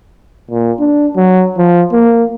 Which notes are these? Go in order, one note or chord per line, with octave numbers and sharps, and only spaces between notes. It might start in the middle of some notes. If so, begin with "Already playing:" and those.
A#2
D4
F#3
F3
A#3